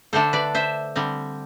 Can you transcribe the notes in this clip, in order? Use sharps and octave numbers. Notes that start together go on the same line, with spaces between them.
D3 A3 D4 A4 C5
B4 D5
C5 E5
D3 G3 C4